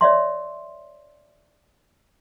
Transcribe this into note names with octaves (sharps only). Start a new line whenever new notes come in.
C#5 D5 E5 C6